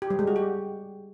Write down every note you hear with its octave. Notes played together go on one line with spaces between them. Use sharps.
G4
G3
G#3
F#4
G4